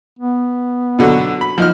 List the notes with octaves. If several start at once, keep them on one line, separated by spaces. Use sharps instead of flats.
B3
B2 D3 F#3
B5
F3 D#4 F6